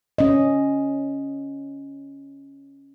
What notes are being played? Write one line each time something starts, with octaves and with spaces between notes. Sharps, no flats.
C#4 D#5